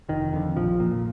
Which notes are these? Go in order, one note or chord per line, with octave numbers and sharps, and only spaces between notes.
F1 D#3
F2 D3
A#1 F3
A#2